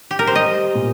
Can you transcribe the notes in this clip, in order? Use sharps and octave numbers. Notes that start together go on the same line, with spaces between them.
G4
A#4
C5
G3 D#5
A#2